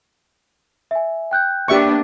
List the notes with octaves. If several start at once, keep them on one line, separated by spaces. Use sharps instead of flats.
E5 G#5
G5 F#6 G6
A#3 B3 D4 G4 E5 C#6